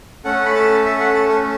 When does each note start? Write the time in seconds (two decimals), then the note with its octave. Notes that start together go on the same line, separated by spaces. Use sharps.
0.25 A3 C#4 A4 F#5
0.45 B5
0.55 A5
0.85 E5
1.00 F#5
1.14 A5
1.30 A4